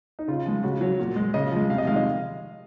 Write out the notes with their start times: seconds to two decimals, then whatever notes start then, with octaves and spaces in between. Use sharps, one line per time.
0.19 D#4
0.28 C#3 F4
0.45 F3 G#3
0.63 C#3 F#4
0.81 F#3
0.99 A#2
1.16 G#3
1.34 C#3 D#5
1.52 F3 G#3
1.69 C3 F5
1.78 D#5
1.87 D#3 G#3 F5
1.96 D#5